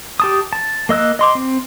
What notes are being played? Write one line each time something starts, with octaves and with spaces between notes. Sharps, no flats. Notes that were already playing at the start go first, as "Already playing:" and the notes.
G4 A5 D#6
A5
A#3 D#5 E6 F#6
D#5 C6 D6
C4